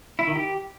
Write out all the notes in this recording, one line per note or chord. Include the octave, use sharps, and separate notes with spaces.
E4
D#3
G4